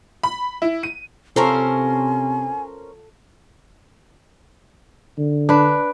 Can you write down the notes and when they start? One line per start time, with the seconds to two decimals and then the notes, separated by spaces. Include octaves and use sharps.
0.23 B5
0.62 E4
0.83 D#7
1.36 C3 C#4 F4 A4 A#4 C5 G#5
5.18 D3
5.49 D4 B4